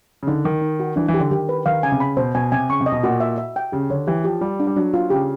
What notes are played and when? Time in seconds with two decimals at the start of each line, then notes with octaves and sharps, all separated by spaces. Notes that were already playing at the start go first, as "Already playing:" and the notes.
0.23 C#3
0.27 D3 D#4
0.45 D#3 D#4
0.62 D#4
0.80 F#4
0.96 E3 D4
1.08 E3
1.14 G4
1.20 D3
1.31 D#3 G4
1.49 B4
1.66 D#3 F5
1.83 C#3 G#5
1.92 C3
2.00 C#3 B5
2.17 B2 C5
2.35 B2 G#5
2.52 C3 G#5
2.69 C#3 C#6
2.81 C3
2.86 D#5
2.92 B2
3.03 A#2 F#4
3.20 E5
3.38 E5
3.56 G5
3.72 C#3 G4
3.90 D3 C#5
4.07 E3 G4
4.24 F3 G4
4.41 G3 F4
4.60 D4
4.67 G3
4.76 F#3 D4
4.94 F4
5.10 C#3 G4